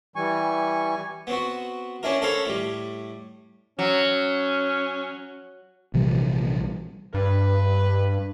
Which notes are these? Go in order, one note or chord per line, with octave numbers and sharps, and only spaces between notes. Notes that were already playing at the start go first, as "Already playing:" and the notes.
E3 G3 G#5 C#6
B3 C4 F#4
C#4 D4 E4 A#4
A4 A#4 C5 C#5 F5 B5
A2 G3
F#3 C#4
A#1 C3 E3 G3
G2 B4